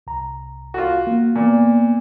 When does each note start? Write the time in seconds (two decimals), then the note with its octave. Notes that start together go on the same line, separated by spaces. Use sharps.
0.07 C2 A#5
0.74 F4 F#4
1.07 A#3
1.35 A#2 A#3 B3